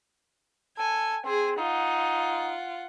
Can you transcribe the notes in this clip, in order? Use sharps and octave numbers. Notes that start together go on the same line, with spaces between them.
A4 G#5
C4 G#4
D#4 F4 F#5